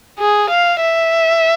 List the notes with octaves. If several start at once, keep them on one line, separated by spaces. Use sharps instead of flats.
G#4
F5
E5